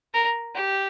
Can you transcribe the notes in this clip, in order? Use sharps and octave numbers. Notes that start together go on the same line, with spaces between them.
A#4
G4